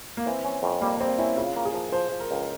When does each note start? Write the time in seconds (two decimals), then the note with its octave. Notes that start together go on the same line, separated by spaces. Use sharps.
0.17 A#3
0.26 E3 C4
0.44 C#4
0.63 F2
0.81 G3 A#3
1.01 G3 C4
1.18 C#4 E4
1.37 C#3 F4
1.56 A#3
1.65 G#4
1.74 F3
1.92 F3 C5
2.12 F3
2.20 A#4
2.31 C#2